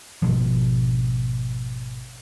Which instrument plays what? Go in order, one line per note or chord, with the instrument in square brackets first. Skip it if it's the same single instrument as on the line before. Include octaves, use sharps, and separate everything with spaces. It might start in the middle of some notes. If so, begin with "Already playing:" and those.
[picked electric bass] G#1 C#2 B2 F3